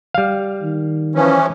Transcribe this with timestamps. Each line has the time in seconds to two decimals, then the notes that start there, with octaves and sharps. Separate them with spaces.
0.14 G3 F5
0.63 D#3
1.15 E3 F3 C#4